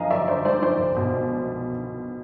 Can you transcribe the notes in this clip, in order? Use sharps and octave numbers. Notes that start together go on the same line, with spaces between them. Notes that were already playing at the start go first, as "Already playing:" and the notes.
Already playing: F#2 D3 F3 G#3 D#5 F5 G#5 A#5
F#2 D5 E5
D3 C5 D5
G#3 C5 D5
F3 C5 D5
C2
B2